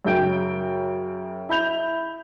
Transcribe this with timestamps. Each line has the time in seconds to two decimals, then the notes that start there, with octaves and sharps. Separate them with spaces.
0.05 F#2 C#3 E5 G5 G6 D7
1.49 E4 B5 G6 F7